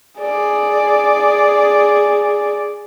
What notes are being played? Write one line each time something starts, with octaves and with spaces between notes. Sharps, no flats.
G#4 D5